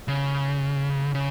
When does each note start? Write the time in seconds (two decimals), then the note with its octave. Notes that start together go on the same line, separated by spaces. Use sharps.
0.08 C#3
1.15 C#3